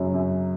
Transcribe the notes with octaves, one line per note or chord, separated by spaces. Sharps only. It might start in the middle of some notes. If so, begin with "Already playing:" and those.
Already playing: F#2 C#3 F#3
F#2